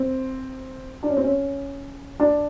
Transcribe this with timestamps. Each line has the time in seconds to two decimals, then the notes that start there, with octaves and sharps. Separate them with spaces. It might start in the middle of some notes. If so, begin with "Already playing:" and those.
Already playing: C4
1.03 D4
1.09 C#4
1.17 C4
1.24 C#4
2.20 D4